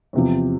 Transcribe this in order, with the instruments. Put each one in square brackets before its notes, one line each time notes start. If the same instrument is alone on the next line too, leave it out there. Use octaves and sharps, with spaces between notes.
[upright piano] E2 C3 F3